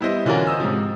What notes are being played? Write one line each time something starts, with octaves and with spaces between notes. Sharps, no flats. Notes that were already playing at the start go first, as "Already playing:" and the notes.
G3 B3 E4 B4 C5 D#5
D3 E3 C#4 F4 F#4 A#4
C5 D#5 D#6 E6
G#2 C3 F3